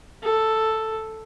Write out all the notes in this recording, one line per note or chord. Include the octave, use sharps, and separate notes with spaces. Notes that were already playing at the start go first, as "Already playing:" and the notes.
A4